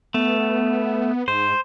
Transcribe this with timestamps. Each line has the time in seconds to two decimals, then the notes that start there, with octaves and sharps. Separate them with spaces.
0.14 A3 B3
1.28 G#2 C5